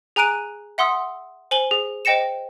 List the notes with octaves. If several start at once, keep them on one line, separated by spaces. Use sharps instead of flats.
G#4 G#5 A#5 F#6 D7 D#7
E5 F#5 C6 D#6 E6
C5 G#5 F#7 G7
G#4
C5 D#5 G5 A#6 C#7 E7